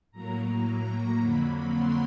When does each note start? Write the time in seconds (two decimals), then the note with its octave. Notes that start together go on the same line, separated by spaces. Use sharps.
0.12 A2 F#3 A#3 A#5
1.19 F2 D3 F#3 A#3 B5
1.73 C6